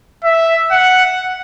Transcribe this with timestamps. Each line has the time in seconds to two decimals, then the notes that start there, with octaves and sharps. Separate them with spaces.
0.24 E5
0.71 F#5